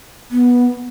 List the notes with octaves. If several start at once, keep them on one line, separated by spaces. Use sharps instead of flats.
B3